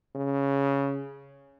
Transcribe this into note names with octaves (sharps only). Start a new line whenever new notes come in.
C#3